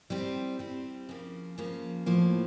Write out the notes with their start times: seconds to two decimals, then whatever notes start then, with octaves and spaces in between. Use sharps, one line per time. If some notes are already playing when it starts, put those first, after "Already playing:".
0.10 G3 C4 E4
0.59 G3 C4 E4
1.09 C#3 F3 A#3
1.58 C#3 F3 A#3
2.06 A2 F3 A#3